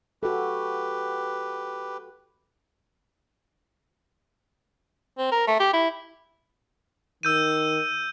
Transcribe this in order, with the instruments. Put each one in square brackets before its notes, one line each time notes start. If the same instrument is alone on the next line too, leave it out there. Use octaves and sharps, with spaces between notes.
[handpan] F#4 A4 [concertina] G4 B4
[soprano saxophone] C4
A#4
A3
G4
E4
[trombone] D#3 [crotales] E6 G6 D#7